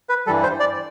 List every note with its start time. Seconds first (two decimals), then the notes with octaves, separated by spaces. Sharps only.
0.09 B4
0.27 G2 E3 G3 A4
0.43 C5
0.60 D5